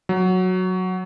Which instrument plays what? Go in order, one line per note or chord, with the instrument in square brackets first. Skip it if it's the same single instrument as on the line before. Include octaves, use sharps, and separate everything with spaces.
[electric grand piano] F#3